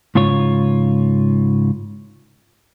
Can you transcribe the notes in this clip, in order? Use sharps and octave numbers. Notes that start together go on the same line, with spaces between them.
G#2 C#3 F4 C#5